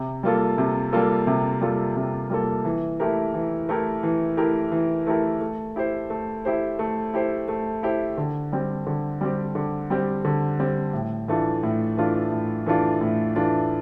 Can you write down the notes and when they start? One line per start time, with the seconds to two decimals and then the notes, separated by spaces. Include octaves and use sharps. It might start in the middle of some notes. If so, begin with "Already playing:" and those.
Already playing: C3
0.23 G3 A#3 F4 A4
0.58 C3
0.93 G3 A#3 F4 A4
1.27 C3
1.61 G3 A#3 F4 A4
1.96 C3
2.30 G3 A#3 F4 A4
2.65 E3
3.00 A3 E4 G4 A#4
3.34 E3
3.69 A3 E4 G4 A#4
4.03 E3
4.37 A3 E4 G4 A#4
4.72 E3
5.07 A3 E4 G4 A#4
5.41 A3
5.76 E4 G4 C5
6.10 A3
6.45 E4 G4 C5
6.79 A3
7.14 E4 G4 C5
7.48 A3
7.83 E4 G4 C5
8.18 D3
8.52 G3 C4 G4
8.87 D3
9.21 G3 C4 G4
9.55 D3
9.90 G3 C4 G4
10.25 D3
10.60 G3 C4 G4
10.94 A2
11.28 E3 A3 D4 F4
11.63 A2
11.97 E3 A3 D4 F4
12.32 A2
12.66 E3 A3 D4 F4
13.01 A2
13.36 E3 A3 D4 F4